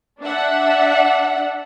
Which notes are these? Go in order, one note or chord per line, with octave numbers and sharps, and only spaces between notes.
D4 E5 F#5